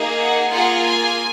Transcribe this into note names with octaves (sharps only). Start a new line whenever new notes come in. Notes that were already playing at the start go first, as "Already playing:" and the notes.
Already playing: A#3 D#4 G#4
F#5
A#3 F4 G#4 F#5
G#5